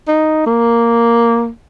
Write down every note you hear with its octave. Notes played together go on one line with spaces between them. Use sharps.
D#4
A#3